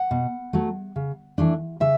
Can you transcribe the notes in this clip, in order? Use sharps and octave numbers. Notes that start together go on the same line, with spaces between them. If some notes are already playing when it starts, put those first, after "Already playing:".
Already playing: F#5
B2
F#3 A3
C#3
E3 A3 D4
C#3 E5